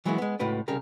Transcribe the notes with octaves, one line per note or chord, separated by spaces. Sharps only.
E3 F#3 G#3 A#3 B3 E4
G#3 B3
C#2 A2 F#4 B4 G5
C2 C#3 G4 A#4 A#5